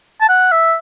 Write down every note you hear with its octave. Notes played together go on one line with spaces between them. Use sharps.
A5
F#5
E5